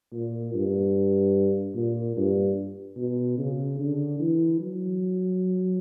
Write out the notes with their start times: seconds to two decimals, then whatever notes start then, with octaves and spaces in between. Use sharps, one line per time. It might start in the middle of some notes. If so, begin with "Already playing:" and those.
0.13 A#2
0.54 G2
1.75 A#2
2.17 G2
2.97 B2
3.38 C#3
3.79 D3
4.20 E3
4.60 F#3